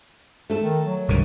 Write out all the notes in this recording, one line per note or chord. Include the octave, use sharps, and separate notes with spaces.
A3 A4
D#3
F#3
C2 G2 D#3